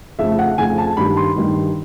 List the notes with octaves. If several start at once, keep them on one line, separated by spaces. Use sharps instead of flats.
F2 C#3 F3 A3 E5
F#5
F2 C#3 F3 A3 G#5
A5
G2 D#3 G3 B5
C6
G2 D#3 G3